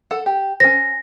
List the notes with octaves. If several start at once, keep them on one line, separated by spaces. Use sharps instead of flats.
A4 F#5 A5
G4
C#4 C5 A#6